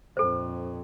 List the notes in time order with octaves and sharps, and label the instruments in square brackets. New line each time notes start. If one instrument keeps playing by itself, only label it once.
[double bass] A#1 F2 [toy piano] A4 C5